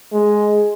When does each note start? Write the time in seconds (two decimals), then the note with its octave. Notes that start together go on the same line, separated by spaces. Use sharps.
0.13 G#3